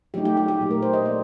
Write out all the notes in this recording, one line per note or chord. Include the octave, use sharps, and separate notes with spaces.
F#3 A3 D#4 G4
G4
G4
G4
A#2 F#3 A3
A#4
C5
D#5
F#3 A#3 D#4 D5